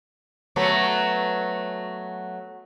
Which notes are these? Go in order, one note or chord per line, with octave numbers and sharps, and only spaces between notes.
F#3 A3 B3